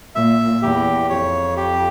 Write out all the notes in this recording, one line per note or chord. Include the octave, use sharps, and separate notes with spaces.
A#2 E5
E2 G4
F2 C#5
G4